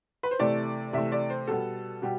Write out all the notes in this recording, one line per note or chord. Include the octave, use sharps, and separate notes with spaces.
B4
C5
C3 E3 A3 D5
C3 E3 A3 E5
D5
C5
B2 G3 B3 A4
B2 G3 B3 G4